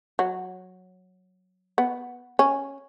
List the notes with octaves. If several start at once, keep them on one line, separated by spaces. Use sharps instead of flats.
F#3
B3
C#4